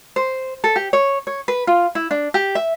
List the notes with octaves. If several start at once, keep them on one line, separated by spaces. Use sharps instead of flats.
C5
A4
G4
C#5
C#5
B4
F4
E4
D4
G4
E5